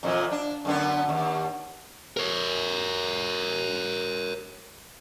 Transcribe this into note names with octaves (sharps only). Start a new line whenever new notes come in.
F2 A#2 E3
D4
F#2 D3 B3
D#2
A#4 C#5